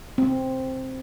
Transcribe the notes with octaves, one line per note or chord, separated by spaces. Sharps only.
C4